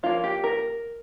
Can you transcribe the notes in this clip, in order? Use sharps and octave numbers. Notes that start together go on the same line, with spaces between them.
F3 A#3 C#4 F4
G4
A#4